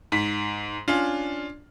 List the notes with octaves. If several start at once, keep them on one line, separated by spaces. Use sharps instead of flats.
G#2 B6
C#4 D4 F4